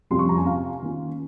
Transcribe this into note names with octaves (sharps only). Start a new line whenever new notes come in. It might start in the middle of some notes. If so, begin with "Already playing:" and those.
F2 C3 G3 C#4 F4 C6
C#6
A#5
G#5
F5
D#3 A#3 C#4 F4